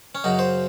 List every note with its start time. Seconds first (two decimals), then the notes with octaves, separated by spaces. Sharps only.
0.15 C#4
0.24 F#2 C#3 F#3 D#4
0.39 C5